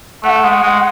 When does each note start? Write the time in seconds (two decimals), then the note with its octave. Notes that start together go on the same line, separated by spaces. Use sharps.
0.23 A3 F#5
0.44 G#3
0.62 G#3